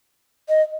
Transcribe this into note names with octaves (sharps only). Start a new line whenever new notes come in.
D#5